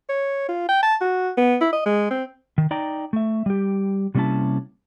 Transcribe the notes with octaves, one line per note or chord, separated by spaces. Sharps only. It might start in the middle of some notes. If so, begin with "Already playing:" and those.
C#5
F4
G5
A5
F#4
B3
E4
D#5
G#3
C4
D#3
D#4 D5 G5 A#5
A3 E5
G3 G4
C3 G3 A#3 C#4 E4 A5